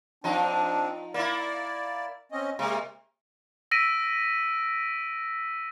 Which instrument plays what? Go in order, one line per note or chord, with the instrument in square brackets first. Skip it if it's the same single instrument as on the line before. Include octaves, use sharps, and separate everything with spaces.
[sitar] F3 D#4 [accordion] C4 D4
[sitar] A#3 E4 [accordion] D5
[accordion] C4 C#4 D#5
[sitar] C3 [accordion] G#3 A#3
[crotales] E6 A#6 B6 D7 D#7